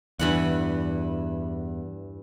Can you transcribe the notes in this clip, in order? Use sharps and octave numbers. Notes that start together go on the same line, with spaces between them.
E2 G2 E3 F#5